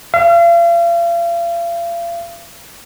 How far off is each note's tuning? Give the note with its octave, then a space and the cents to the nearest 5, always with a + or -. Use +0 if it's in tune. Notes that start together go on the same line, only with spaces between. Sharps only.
F5 -40